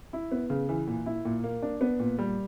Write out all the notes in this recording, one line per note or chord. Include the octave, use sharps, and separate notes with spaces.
E4
B3
C#3
E3
A#2
E4
A#2
A#3
D4
B3
A#2
G3